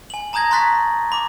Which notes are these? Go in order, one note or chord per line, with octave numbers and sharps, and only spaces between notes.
G#5 F#7
A5 A#5 D#6 G6 G#6 A#6
A#5 C6 C#6 F#6 A6 B6
B5 D6